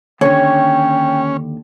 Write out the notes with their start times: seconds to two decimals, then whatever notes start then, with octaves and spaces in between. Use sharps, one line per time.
0.21 D#2 D3 C#4 C#5 G5